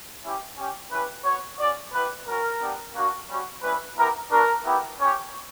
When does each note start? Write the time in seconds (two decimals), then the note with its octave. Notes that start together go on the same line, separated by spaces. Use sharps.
0.24 C#4 E4 G4
0.57 C#4 G4
0.91 C#4 E4 G4 B4
1.25 B3 F#4 C#5
1.59 C#4 F#4 D5
1.93 B3 E4 G4 B4
2.27 C#4 F#4 A#4
2.61 B3 D4 G4
2.94 A#3 D4 F#4
3.28 G3 C#4 F#4
3.62 G3 C#4 E4 B4
3.97 B3 E4 G4 A#4
4.30 B3 D4 F#4 A#4
4.64 B3 E4 G4
4.99 C#4 G4 C#5